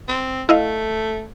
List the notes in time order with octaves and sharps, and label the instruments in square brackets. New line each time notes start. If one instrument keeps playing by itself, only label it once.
[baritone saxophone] C4
[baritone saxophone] A3 [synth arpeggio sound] E4 D#5 F5